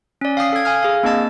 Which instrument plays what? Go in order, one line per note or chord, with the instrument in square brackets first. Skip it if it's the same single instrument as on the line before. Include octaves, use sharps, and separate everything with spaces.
[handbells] C#4 D5
F5 G5 D#6 C7
A4 G#6
F5 G#5 D#6 F6
G#4 F5
A#3 C4 D4 D#5 A5 A6